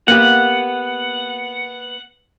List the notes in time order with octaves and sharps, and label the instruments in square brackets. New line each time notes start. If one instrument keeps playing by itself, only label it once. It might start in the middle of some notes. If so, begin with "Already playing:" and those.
[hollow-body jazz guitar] A#3 B3 G4 [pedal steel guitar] F#5